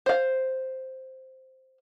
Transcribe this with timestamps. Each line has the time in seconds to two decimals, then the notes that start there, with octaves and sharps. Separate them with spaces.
0.06 C5 F5